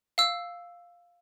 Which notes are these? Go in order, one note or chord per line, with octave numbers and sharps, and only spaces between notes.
F5 E6